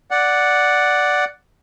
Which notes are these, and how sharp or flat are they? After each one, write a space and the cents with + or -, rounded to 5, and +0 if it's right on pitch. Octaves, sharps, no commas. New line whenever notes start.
D5 +0 F#5 +0